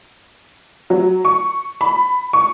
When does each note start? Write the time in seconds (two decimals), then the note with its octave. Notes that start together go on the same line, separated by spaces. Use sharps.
0.90 F#3
1.25 C#6
1.81 B5
2.33 C#6